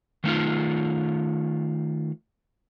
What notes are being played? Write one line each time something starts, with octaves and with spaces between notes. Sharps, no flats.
D#3 A3 D#4 F4